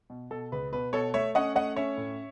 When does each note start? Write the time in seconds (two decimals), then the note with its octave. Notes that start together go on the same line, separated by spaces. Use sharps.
0.10 B2
0.31 B2 A4
0.52 C#2 B4
0.72 B2 B4
0.93 B2 A4 C#5
1.14 A3 C#5 E5
1.35 C#4 D#5 F#5
1.55 A3 D#5 F#5
1.76 C#4 C#5 E5
1.97 A2